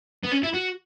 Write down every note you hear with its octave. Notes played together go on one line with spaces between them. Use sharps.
B3
C#4
E4
F#4